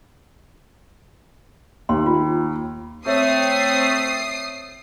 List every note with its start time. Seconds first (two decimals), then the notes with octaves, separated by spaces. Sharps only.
1.89 D#2 C6
2.06 F4
3.06 A3 C4 C#5 E5 D#6 C7